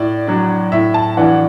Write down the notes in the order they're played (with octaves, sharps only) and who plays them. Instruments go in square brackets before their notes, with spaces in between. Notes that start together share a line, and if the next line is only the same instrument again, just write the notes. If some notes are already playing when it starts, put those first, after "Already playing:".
Already playing: [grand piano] A2 [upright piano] D5
[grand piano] F#3 D4
[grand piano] A2 [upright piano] E5
[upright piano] A5
[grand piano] E3 D4 [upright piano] F#5